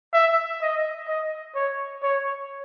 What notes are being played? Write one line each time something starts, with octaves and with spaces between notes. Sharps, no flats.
E5
D#5
D#5
C#5
C#5